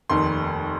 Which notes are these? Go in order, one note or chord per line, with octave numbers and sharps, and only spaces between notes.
F1 D#2 D#3 C6